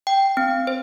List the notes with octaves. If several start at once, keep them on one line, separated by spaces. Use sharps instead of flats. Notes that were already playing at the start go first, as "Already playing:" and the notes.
G5
C4
C5